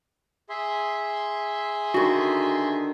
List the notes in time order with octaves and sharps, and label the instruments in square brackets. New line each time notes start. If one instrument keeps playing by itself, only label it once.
[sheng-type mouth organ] G#4 E5 C6
[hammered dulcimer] D3 D#3 [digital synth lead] F#4